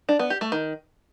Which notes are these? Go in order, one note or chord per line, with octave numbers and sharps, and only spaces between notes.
D4
B3
G4
A3
D#3